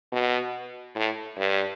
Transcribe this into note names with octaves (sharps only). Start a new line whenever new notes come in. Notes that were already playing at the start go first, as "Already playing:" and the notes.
B2
A2
G2